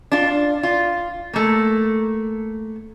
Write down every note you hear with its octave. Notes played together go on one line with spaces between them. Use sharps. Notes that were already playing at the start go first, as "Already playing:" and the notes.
D4 F4
F4
A3 A#3